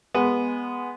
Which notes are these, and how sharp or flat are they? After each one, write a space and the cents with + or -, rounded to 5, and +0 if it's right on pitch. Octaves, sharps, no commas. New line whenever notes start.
G#3 -10 B3 -10